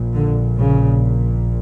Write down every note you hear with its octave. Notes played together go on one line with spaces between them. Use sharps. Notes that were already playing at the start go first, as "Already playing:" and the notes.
Already playing: A#1 A#2
D3
C#3